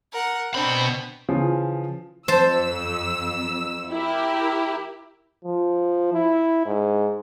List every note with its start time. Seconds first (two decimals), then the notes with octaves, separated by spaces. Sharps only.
0.12 A#4 F#5
0.54 B2 C4 D4 B5
1.29 C#3 E3 F3
2.28 F2 C5 A5 E6
3.90 E4 G4 A#4
5.45 F3
6.13 E4
6.66 G#2